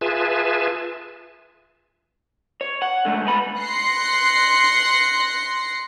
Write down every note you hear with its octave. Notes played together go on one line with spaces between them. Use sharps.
F4 G#4 B4 E5 G#5 A5
C#5
F#5
D3 G#3 A3
G#3 B3 B5
C6 F#6 A#6 C7 C#7